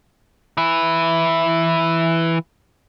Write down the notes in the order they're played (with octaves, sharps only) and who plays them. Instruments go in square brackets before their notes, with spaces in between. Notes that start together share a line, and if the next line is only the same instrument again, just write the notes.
[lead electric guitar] E3 E4